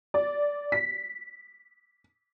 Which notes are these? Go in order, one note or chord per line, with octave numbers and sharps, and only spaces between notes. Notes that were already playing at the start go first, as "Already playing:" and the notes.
D5
B6